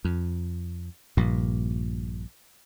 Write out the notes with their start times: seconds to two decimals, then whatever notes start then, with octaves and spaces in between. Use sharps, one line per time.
0.05 F2
1.17 A#1 G2 A#2